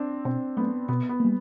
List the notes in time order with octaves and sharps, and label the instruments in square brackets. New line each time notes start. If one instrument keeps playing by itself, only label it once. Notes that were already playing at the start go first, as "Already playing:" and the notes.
Already playing: [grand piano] C4 D4
[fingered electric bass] B2 [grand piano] C4
[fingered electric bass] F#3 A3 C#4 [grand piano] B3
[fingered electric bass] B2 [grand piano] B3
[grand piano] B3
[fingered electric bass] G3 A#3